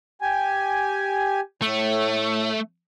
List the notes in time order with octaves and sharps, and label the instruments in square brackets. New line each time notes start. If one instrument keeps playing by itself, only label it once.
[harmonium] G4 G#5
[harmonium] A2 [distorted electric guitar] A3